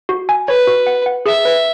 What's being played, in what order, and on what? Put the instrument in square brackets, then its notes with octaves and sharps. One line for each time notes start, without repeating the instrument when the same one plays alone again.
[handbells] F#4
G#5
[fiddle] B4 [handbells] C#5
[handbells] F#4
F#5
F#5
[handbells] G#4 [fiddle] E5
[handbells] B4